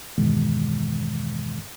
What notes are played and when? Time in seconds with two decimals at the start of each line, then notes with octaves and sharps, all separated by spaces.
0.18 E2 G2 B2 D#3 E3 G#3